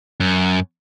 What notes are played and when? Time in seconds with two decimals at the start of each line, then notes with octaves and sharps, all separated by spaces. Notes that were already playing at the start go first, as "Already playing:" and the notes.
0.20 F#2